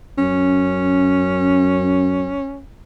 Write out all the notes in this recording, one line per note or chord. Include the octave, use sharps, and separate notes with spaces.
F#2 C#4